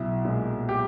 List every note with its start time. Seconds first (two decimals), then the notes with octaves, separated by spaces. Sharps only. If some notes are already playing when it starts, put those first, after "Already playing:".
Already playing: B1 E4
0.25 A#2 G#3
0.69 G4